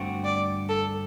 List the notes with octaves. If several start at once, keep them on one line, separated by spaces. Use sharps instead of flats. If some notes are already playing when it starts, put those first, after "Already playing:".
Already playing: G2 D3 A3 C4 F#4
D5
A4